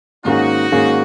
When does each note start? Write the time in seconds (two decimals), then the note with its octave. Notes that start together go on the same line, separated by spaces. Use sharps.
0.25 G#2 D#3 A#3 C#4 D#4 F#4 G#4
0.72 G#2 D#3 A#3 C#4 G#4